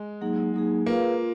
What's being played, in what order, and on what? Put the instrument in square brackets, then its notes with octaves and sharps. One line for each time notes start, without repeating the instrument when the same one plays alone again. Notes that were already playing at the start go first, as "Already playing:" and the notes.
Already playing: [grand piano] G#3
[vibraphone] F#3 A#3 D#4 G#4
F#3 A#3 D#4 G#4
[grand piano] A#3 [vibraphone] F4 G#4 B4 F5
[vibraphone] F4